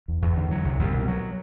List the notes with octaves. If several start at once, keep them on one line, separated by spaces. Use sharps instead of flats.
E2
E2
D3
F#3
C2
C2
B2
F#3